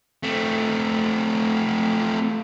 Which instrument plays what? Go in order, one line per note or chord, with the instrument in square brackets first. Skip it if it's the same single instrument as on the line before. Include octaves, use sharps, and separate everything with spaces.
[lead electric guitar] A3 C4